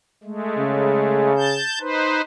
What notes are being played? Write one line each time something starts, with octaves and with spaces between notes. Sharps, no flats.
G#3 A3
C#3
A5 G6
D#4 B4 C5